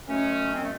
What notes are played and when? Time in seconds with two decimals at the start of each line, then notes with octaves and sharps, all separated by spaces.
0.08 F#2 D#3 F#3 A3 C#4
0.52 C4
0.60 A3